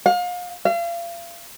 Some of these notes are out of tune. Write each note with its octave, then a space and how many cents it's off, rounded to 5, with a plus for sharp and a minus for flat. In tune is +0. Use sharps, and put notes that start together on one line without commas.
F5 +35
F5 -35